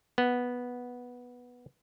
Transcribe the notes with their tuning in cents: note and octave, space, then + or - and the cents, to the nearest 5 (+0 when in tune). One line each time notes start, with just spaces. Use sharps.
B3 -5